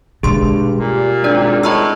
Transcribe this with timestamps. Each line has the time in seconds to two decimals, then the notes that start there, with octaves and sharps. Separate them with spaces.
0.23 G2 B2 G#3 G#4 C6
0.79 A#2 G3
1.24 G#1 D4 D5
1.63 A2 D#5 A#5 E6